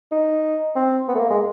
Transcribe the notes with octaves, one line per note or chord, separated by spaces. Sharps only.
D#4
C4
B3
A3
A#3
G#3